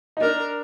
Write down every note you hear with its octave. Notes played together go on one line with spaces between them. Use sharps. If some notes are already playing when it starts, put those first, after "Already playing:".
D#4
D4 A#4